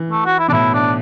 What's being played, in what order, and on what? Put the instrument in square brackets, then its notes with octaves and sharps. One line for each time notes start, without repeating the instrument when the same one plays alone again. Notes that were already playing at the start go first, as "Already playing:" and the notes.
Already playing: [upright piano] E3
[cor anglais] A3
F#4
E4
[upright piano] B2 [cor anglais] D4
[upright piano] A2 [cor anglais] E4
[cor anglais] D4